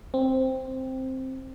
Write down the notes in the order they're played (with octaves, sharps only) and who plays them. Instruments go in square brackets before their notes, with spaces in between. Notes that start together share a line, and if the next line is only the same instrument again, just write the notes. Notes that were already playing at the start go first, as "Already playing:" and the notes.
[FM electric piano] C4